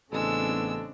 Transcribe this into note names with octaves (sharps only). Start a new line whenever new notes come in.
A1 C#3 G#3 B3 C4 D4 A4 E6